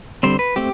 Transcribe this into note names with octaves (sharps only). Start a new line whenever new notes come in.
D3 G3 C4 C5
B4
A3 C4 G4